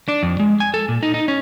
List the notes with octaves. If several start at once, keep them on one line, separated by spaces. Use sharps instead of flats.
D4
F2
G#3
G#5
A4
A#2
D#4
D#4
C#4